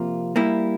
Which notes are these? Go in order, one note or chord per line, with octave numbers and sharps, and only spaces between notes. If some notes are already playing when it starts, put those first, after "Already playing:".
Already playing: C3 F3 A#3 F4
G3 A#3 E4